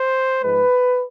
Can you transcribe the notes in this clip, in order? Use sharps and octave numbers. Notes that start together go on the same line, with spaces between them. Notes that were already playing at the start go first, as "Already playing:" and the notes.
Already playing: C5
G#2 F3 G#3 B4